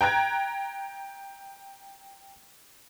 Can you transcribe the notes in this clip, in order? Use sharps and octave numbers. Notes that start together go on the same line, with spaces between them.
G5 A#5 F#6 G#6